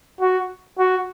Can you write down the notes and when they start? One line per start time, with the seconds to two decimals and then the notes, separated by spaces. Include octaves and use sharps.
0.21 F#4
0.79 F#4